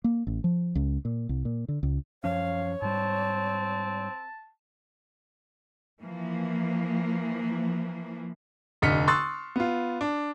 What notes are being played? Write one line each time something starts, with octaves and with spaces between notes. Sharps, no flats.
A#3
A1
F3
C#2
A#2
C2
A#2
D3
C#2
F#2 F3 C#4 C#5 F5
G#2 G3 C4 A5
E3 F3 A#3
F1 D3 D#5 F6 B6 C#7
C6 C#6 D#6 E6 F#6 A6
B3 F4
D4